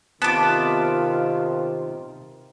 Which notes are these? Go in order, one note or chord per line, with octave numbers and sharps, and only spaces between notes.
C3 D#3 B3 F4 A5 D6